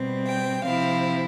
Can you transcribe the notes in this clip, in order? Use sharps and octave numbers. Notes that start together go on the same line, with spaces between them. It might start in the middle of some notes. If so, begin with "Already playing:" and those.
Already playing: B2 G3 C4
G5
C3 F3 C4 E4 F5